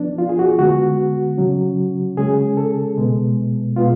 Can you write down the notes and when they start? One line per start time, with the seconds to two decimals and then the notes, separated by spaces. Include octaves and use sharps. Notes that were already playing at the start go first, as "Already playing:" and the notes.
Already playing: F3 B3 D4
0.18 F4
0.29 G#4
0.39 F#4
0.59 D3 G#3 B3 F#4
1.38 C#3 F#3 C#4
2.17 C#3 G#3 C#4 G#4
2.57 A4
2.97 B2 G#3 B3
3.76 B2 G#3 B3 F4